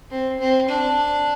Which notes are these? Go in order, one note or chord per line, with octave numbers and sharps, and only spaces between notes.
C4
C4
D4